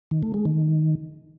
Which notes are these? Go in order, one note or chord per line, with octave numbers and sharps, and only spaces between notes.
D#3
A3
G#3
D#3